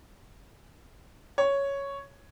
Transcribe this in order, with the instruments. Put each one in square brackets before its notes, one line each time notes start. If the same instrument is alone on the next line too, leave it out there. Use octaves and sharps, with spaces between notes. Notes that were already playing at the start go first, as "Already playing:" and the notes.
[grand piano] C#5